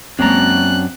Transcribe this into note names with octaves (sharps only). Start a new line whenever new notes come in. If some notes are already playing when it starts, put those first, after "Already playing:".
F#2 G#3 A#3 C4 D4 A#5 F#6